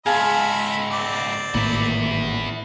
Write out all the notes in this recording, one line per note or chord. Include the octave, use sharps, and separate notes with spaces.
C#2 G#2 G#4 E5 F5 A5 B5
C4 D5 D6
G#1 A2 A#3 B3 E4